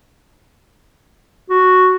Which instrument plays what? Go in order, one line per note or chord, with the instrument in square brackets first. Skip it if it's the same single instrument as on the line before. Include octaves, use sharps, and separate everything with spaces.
[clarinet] F#4